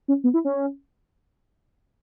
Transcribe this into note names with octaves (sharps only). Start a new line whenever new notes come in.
C#4
B3
E4
C#4